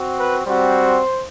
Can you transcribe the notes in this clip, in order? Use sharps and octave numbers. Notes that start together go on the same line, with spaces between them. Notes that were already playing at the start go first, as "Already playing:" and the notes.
Already playing: C4 F#4
B4
G3 C4 F#4 C5